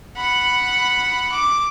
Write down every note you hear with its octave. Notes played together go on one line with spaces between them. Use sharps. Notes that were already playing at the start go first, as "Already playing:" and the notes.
F#5 B5
D6